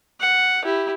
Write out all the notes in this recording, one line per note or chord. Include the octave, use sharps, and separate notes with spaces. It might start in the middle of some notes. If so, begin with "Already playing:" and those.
F#5
E4 G4